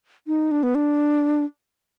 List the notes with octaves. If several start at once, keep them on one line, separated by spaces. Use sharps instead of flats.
D#4
D4
B3
D4